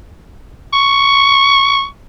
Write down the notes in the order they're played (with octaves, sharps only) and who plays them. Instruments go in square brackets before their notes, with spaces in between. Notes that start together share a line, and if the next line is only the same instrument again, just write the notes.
[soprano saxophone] C#6